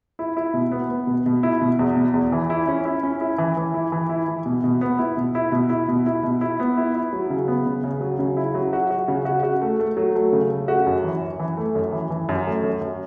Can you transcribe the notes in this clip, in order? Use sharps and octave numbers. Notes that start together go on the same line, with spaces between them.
E4
E4
B2
B3
B3
B2
B2
E4
B2
E2
B2
E2
E3
E4
C#4
E4
C#4
E4
E3
E3
E4
E3
E4
E3
B2
B2
B3
E4
B2
E4
B2
E4
B2
E4
B2
E4
B3
E4
E4
F#3
C#3
B3
C#3
C#3
F#3
C#3
E4
F#3
F#4
F#4
C#3
F#4
F#4
A3
A3
F#3
A3
C#3
A3
F#4
F#2
E3
F#2
E3
A3
F#2
E3
E3
F#2
A3
F#2
F#2